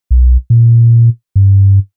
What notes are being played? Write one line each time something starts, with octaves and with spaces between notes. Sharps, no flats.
B1
A#2
G2